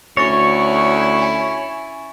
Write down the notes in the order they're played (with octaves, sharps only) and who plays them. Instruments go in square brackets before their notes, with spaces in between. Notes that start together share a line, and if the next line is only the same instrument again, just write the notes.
[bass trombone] D2 [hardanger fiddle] C#4 E4 [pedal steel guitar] C#5 [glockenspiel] C#6 A6 A#6
[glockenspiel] G#5